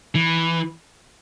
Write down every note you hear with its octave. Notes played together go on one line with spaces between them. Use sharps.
E3